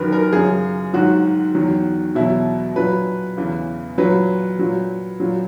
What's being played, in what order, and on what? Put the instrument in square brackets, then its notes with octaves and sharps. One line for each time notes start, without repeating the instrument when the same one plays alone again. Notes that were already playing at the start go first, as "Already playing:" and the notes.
Already playing: [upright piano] F#2 D#3 F#3 A#4 B4
A#4
F#2 C#3 F#3 G#4
G#2 D#3 F#3 F#4
E2 D#3 F#3
E2 B2 F#3 E4
A#2 F#3 B4
E2 C#3 E3
A#2 F#3 B4
A#2 F#3
A#2 F#3